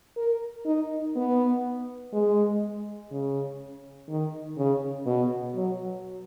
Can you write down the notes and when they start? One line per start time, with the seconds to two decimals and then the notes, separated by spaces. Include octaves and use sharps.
0.17 A#4
0.66 D#4
1.16 B3
2.13 G#3
3.12 C#3
4.09 D#3
4.57 C#3
5.06 B2
5.55 F#3